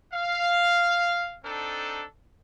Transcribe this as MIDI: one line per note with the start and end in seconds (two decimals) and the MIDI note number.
0.13 1.36 77
1.44 2.04 60
1.44 2.04 62
1.44 2.04 63
1.44 2.04 69